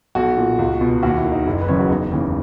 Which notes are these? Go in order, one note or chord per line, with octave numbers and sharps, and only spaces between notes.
B1 F#4
A#2
C#2
B2
D#2 F#4
E4
D#3
D#4
F#1 E4
B4
F#2 C#3 E3 C#5
F#4
E1 D#4
D#2 C#3 E3